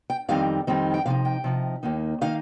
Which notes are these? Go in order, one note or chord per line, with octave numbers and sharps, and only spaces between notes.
G5
F2 D#3 G3 C4 D#4 F5
F2 D#3 G3 C4 D#4
G5
C3 F3 D#4 F5
G5
C3 F3 D#4
D#2 D#3 A#3 D#4
D#3 A#3 D#4 F5